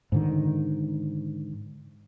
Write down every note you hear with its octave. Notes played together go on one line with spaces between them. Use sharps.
G#2 D3 D#3